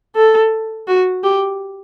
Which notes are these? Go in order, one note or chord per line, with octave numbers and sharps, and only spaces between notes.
A4
F#4
G4